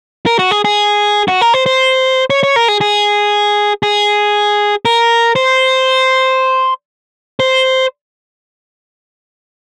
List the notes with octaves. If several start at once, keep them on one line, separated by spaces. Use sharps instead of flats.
A#4
F#4
G#4
G#4
F#4
A#4
C5
C5
C#5
C#5
A#4
G#4
G#4
G#4
A#4
C5
C5